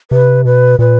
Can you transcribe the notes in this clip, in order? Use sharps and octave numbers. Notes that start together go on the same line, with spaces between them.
C3 B4
B2 B4
A#2 B4